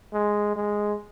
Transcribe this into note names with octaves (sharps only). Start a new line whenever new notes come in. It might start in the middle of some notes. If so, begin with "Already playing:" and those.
G#3
G#3